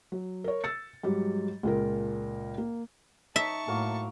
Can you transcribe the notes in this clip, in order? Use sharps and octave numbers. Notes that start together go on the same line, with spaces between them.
F#3
A#4 C#5
E6 A6 C#7
G#2 F#3 G3 G4
C#2 A#2 A#4
A#3
D#4 E5 A5 C#6
A2 F#3 A#3 A#4